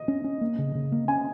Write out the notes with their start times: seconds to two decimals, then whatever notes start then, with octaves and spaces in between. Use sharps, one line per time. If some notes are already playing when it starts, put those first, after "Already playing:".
Already playing: D#5
0.08 C#4
0.24 C#4
0.41 A#3
0.58 C#3
0.75 C#3
0.92 A#3
1.08 C#4 G#5